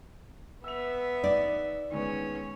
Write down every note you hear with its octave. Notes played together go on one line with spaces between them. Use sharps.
B3 E5 E6 F7
D#4 D5
D#3 G#3 B3 C#4